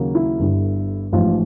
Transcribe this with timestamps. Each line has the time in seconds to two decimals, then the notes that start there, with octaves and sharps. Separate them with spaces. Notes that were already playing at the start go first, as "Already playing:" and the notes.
Already playing: D#2 C#3 F#3 A#3
0.15 E4
0.39 G1 G2 D3
1.12 A1 G#2 F3 F4